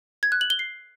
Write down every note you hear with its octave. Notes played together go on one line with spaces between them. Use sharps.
G#6
F#6
F#7
G7
C7